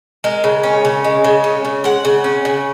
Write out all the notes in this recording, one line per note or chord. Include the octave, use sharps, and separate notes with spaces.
G#3 A#4
C#3
C#4
C#3
G#3
C#3
C#4
C#3
G#3 F#5
C#3
C#4
C#3